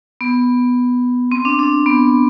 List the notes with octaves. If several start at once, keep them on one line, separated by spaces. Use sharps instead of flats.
B3
C4
D4
D4
B3